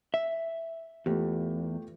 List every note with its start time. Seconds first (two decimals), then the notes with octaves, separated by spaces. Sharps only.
0.14 E5
1.06 E2 A3 F4 G4